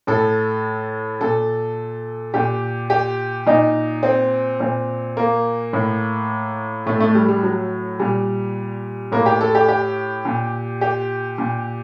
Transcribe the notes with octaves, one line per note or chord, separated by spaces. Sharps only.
A2 A4
A#2 A4
A#2 G4
G4
A#2 D#4
C4
A#2 C4
A#3
A2
A2 A3
A3
G3
G3
F#3
A#2 G3
A2 A#3
G4
A4
G4
G4
A#2
G4
A#2